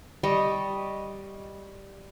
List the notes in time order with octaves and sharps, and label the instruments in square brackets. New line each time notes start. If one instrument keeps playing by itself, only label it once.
[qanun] G3 D#5 C#6